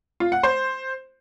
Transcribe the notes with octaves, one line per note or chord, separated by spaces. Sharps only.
F4
F#5
C5